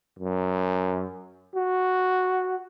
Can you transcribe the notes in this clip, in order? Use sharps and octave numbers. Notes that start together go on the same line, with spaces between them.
F#2
F#4